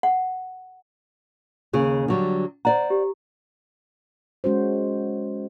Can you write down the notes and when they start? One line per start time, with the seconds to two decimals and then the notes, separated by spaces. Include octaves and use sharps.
0.03 F#5
1.73 D#2 C#3 G#4
2.08 D3 F#3 G3
2.65 C5 D5 F#5 A#5
2.90 G4
4.44 G#3 C#4 F#4 C5